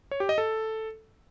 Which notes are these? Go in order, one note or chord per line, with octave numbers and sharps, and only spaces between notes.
C#5
G4
D#5
A4